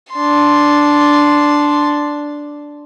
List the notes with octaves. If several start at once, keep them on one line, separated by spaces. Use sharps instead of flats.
D4 C6